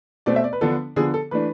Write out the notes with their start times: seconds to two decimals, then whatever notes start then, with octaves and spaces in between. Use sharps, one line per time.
0.26 B2 A3 C4 D5
0.36 E5
0.44 D5
0.53 B4
0.61 D3 F3 B3 D4 A4
0.96 D3 F3 B3 G#4
1.14 A4
1.31 E3 A3 D4 B4